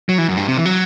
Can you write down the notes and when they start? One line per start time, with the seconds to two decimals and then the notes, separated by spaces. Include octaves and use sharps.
0.09 F#3
0.18 E3
0.29 F#2
0.37 G2
0.48 C3
0.57 E3
0.65 F#3